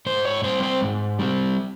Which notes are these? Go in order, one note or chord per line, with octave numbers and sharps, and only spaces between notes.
G#2 C5
C#5
G3 C4 C5
C5
G#2
G3 C4